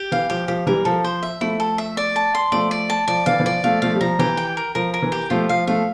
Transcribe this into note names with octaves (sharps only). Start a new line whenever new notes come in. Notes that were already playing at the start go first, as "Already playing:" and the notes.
Already playing: G4
E3 F5
F3 G4
F3 G4
E3 G3 A#4
F3 A4
C5
E5
F3 A3 E4
A4
E5
D5
A5
C6
F3 A3 D5
D5
A5
F3 D5
E3 F5
E3
F3 D5
F3 A3 F5
F3 A3 F5
G3
F3 A#5
E3 G4
G5
A#4
F3 A#4
A#4
E3
G4
F3 A3 F4
F3 F5
F3 A3 F5